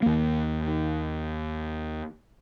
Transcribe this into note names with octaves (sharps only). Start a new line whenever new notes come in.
D#2 A#3